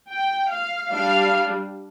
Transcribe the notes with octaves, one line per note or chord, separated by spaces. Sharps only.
G5
F5
G3 D4 F5